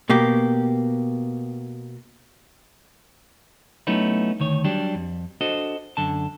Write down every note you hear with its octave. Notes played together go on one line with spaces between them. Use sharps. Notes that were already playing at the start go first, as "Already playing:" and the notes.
B2 A#3 G4
F#3 A3 B3 C#4 D#4 E4
D2 D#3 C#5
F#3 G3 D4 G4
F2
D4 F#4 A4 C5 D#5
F#2 D3 A5